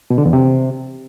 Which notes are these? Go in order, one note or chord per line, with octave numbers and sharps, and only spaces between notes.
B2
D3
E2
C3